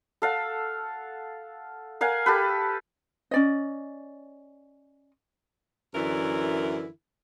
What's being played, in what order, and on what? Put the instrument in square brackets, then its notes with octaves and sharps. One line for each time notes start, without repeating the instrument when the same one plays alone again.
[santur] A4 F5 F#5
A#4 F5 F#5 G#5
G4 A4 B4
[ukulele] C#4 D5 D#5
[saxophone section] F#2 D3 E3 E4 A#4